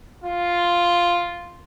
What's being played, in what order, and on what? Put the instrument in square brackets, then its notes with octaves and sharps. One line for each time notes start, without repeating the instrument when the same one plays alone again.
[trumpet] F4